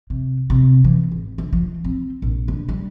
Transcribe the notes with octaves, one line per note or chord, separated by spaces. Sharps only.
C3
C3
E3
G#1
D3
F3
C4
A#1
D3
G3